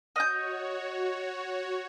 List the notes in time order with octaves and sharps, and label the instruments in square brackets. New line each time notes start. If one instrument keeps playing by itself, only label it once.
[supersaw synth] F#4 C#5 [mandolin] D#5 F#6 G6